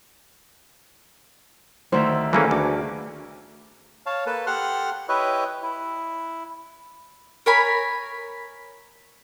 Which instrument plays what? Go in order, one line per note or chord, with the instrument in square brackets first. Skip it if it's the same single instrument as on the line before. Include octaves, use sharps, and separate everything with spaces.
[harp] D2 D#3 E5 [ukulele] C5
[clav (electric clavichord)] E3 A#3 C#4 [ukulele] G#4 A4 B4
[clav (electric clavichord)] D2 [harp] D6
[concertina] C#5 F5 A5
A#3 A4 B4 A5
G4 A4 F#5 C6 F6 F#6
E4 G4 B4 C#5 D#5 E5
E4
[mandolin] A#4 C#5 G#5 B5